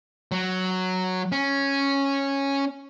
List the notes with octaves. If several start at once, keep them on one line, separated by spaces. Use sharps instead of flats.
F#3
C#4